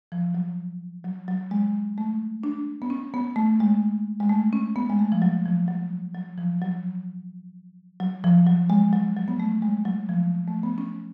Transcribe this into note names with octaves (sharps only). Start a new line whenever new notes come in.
F3
F#3
F#3
F#3
G#3
A3
D4
B3
C#4
B3
A3
G#3
G#3
A3
C#4
B3
G#3
A3
F3
F#3
F3
F#3
F#3
F3
F#3
F#3
F3
F#3
G#3
F#3
F#3
B3
A3
G#3
F#3
F3
A3
B3
C#4